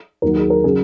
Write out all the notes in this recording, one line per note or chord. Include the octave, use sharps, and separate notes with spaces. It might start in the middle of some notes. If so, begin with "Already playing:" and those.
D#2 D#3 F#3 A#4
G#4
A#4
C#3 F#3 G#4